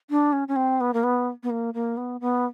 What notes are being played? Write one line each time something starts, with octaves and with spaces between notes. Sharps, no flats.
D4
C#4
C#4
C4
B3
A#3
B3
B3
A#3
A#3
B3
B3